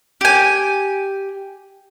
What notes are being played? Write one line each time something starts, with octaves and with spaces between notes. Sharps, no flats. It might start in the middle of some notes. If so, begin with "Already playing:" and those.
G4 G#5